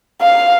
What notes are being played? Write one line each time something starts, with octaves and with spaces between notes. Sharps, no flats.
F5